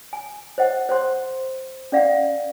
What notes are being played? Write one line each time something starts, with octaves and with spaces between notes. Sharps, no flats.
G#5
C5 D#5 F#5
C5 F#5 C6
C#4 D5 F5 F#5